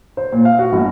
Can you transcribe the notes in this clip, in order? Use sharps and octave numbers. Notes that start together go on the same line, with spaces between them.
C5
A#2
F5
F#4
G1